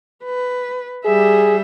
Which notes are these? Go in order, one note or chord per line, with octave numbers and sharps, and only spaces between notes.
B4
G3 G#4 E5